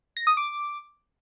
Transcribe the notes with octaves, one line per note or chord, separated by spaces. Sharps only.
A#6
D#6
D6